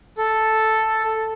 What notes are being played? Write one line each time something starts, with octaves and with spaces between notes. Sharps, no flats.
A4